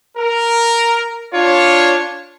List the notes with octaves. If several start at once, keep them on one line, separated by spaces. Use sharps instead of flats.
A#4
D4 F4 C#5